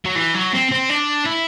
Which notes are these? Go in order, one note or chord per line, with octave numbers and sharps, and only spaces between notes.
F#3
E3
F#3
C4
C4
D4
E4